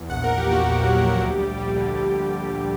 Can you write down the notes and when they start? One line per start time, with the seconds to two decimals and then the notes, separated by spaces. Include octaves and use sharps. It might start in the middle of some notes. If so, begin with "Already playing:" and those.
Already playing: E2
0.09 A#1 F#5
0.24 A#1 A#4
0.38 G4
0.46 A#2
0.51 F#4
0.65 A#1 G4
0.83 F#3
1.02 A#1
1.21 D2
1.39 G3
1.57 G3
1.76 D3
1.95 D2